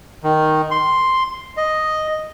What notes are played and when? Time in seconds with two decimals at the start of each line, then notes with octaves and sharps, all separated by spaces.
0.23 D#3
0.71 C6
1.57 D#5